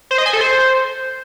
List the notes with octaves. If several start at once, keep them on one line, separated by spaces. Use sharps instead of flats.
C5
D#5
G#5
A4
C5